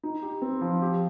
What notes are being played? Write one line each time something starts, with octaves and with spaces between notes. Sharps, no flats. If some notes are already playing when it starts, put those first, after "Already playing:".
D#4
G4
C4
F3
G4